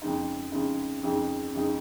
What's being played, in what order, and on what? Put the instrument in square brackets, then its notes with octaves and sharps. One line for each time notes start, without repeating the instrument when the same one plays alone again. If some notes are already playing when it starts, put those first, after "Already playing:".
[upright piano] F2 C#3 G#3 D#4
F2 C#3 G#3 D#4
F2 C#3 G#3 D#4
F2 C#3 G#3 D#4